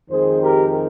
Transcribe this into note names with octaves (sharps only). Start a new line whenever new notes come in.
F2 D#3 G#3 C4 G#4 C5
G4 A#4